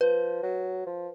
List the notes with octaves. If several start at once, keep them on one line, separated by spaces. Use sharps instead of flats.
F3 B4
F#3
F3